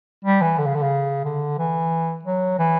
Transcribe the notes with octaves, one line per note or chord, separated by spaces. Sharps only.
G3
E3
D3
C#3
D3
C#3
D3
E3
F#3
E3